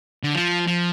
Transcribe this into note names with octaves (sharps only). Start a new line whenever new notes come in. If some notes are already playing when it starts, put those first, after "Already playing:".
D3
F3
F3